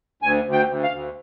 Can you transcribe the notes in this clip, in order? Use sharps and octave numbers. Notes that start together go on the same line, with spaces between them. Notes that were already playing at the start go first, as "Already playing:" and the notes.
D2 G#5
D2
G5
D2
F5
D2